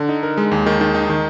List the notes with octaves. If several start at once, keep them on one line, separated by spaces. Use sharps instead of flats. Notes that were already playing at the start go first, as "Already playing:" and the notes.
Already playing: D3
D#4
A#4
G#3
D#2
D#3
D#3
D#4
D#3